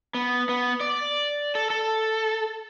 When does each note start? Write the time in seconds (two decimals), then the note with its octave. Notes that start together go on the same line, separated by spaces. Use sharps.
0.14 B3
0.49 B3
0.80 D5
1.55 A4
1.70 A4